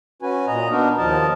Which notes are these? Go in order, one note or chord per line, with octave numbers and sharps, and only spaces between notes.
C#4 F#4 B4 G#5
A#2 D#5 A#5
B3 D4 D#4 F#4 A#4
D#2 F3 A#4 D#5 A5